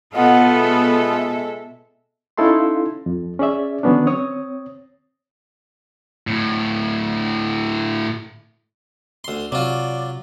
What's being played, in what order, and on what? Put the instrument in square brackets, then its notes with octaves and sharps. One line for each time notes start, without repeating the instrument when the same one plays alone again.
[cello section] B2 A4 [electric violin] B3 F4 [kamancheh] D#5 F#5
[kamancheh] G#3 E5
[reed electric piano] C#4 D#4 E4 A4 F5 C6
F2
C#4 G#4 D5 E5
D3 D#3 F#3 B3 C#4 D4
C4 C#5 D#6
[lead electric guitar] D2 A2
[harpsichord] D2 C6
[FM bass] C3 [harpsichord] F#3 F4 [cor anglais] D5